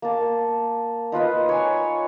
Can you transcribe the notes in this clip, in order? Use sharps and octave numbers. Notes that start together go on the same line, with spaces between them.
A#3 A5
D#4 F4 B4 D#5
C#5 G#5